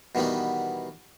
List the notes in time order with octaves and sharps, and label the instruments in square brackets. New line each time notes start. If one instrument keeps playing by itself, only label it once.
[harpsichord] B2 D#3 E3 G3 B3